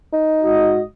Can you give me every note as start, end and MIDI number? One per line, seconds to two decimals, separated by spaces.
0.13 0.71 63
0.43 0.81 44
0.43 0.81 66
0.43 0.81 75